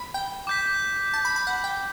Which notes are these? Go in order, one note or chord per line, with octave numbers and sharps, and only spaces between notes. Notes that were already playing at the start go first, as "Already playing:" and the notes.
Already playing: B5
G5
D6 G6 B6
A5
B5
B5
F#5
G5